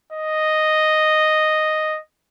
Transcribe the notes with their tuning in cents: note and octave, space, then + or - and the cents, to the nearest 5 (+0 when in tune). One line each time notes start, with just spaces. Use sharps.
D#5 -5